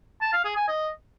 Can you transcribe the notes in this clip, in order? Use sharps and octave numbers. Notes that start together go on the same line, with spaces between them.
A5
F5
G#4
G#5
D#5